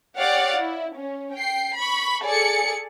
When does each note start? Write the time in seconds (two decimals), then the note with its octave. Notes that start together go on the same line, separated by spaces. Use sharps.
0.18 G4 C#5 D5 F5 F#5
0.56 E4
0.96 C#4
1.33 G5 C7
1.77 B5 C#6
2.23 G#4 A4 D5 C#7